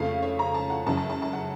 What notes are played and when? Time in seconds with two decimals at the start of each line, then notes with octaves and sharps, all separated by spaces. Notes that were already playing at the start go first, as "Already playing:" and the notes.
Already playing: F2 C#3 F3 A3 F5
0.23 C#5
0.39 A#5
0.54 A5
0.70 F#5
0.86 F#1 F#2 C#3 A5
0.97 A5
1.10 A5
1.22 A5
1.33 F#5